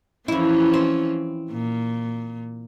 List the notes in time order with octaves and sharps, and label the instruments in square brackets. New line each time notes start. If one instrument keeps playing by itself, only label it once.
[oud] F2 E4 [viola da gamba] E3 F3 C#4
[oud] C4
[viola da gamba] A#2